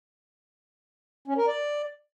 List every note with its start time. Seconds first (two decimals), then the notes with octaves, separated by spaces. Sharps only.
1.28 C#4
1.38 A#4
1.47 D5